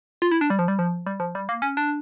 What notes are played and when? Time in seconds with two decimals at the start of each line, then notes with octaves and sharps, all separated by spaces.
0.22 F4
0.31 E4
0.41 D4
0.50 G3
0.59 F3
0.68 G3
0.79 F3
1.07 G3
1.20 F3
1.35 G3
1.49 A#3
1.62 C#4
1.77 D4